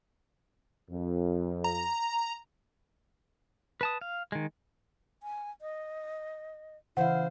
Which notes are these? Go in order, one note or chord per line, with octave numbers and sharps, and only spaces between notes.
F2
A#5
B4 A5 D#6
F5
D#3 G#3
G#5
D#5
C#3 E3 E4 C5 F5 F#5